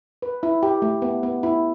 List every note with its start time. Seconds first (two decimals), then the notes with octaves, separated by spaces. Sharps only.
0.22 B4
0.43 E4
0.63 G4
0.82 A3
1.02 B3
1.23 B3
1.43 E4